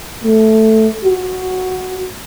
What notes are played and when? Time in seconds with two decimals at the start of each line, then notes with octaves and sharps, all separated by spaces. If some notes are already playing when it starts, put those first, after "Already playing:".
0.24 A3
1.04 F#4